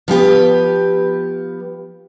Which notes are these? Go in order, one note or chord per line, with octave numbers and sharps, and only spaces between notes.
F3 B3 G4 B4